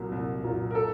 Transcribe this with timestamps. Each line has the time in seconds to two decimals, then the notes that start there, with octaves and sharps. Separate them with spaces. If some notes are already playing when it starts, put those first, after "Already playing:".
Already playing: C2 A#2 F#3 A#3
0.12 C2
0.44 A#2 F#3 A#3
0.71 A#4
0.75 A4